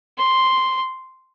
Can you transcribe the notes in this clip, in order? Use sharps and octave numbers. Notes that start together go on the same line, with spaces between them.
C6